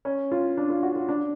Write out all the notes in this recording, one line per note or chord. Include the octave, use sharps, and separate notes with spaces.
C#4
F4
D4
F4
F#4
F4
D4